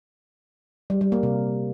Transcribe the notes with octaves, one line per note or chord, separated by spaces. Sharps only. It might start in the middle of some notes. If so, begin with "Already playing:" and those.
G3
G3
A#3
C3